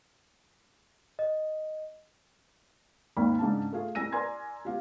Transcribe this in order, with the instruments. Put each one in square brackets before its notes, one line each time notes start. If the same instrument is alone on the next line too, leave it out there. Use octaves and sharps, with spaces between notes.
[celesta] D#5
[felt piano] G#1 D#2 D#3 B5
G#2 C#3 D4 A5
A3 F4 G#4
C2 G#5 E6 A#6 D#7
A#4 D5 G#5 C6 G#6
B3 F4 G4